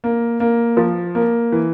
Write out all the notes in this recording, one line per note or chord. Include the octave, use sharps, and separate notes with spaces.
A#3
A#3
F3
A#3
E3